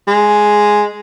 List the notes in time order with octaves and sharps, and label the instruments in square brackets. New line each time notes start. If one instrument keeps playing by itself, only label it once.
[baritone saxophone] G#3